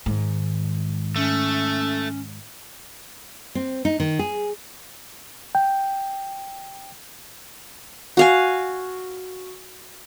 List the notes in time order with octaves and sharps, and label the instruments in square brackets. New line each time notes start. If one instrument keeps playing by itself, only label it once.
[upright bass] G#2 D#3
[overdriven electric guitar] A3 [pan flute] C#4
[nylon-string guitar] C4
D#4
D#3
G#4
[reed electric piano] G5
[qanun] F#4 F5 G#5